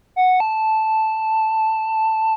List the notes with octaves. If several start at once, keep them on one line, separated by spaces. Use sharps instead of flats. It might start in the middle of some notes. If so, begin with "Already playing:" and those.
F#5
A5